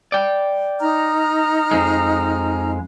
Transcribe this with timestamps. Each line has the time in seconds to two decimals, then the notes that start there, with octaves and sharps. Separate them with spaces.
0.12 D5 G5
0.80 D#4 A#5 F6
1.71 F2 G#3